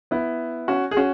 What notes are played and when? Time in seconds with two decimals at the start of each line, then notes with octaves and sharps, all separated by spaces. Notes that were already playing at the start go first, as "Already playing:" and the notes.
0.11 B3 E4
0.68 C#4 F#4
0.91 G#4
0.97 C#4 F#4